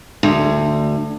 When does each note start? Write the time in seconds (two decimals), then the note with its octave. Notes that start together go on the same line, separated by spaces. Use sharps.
0.23 D2